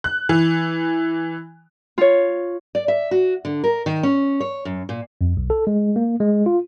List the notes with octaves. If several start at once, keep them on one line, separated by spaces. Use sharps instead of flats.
F#6
E3
F4 C#5
D5
E5
F#4
D3
A#4
D#3
C#4
C#5
F#2
A#2
F2
B1
A4
G#3
A#3
G#3
F4